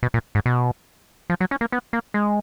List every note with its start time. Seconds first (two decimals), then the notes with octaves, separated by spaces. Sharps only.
0.03 B2
0.14 A#2
0.35 G#2
0.46 B2
1.30 F3
1.40 F#3
1.51 C#4
1.61 A#3
1.72 B3
1.93 A#3
2.14 G#3